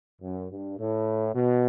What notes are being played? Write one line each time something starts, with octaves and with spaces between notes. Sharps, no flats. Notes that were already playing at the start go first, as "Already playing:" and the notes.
F#2
G2
A2
B2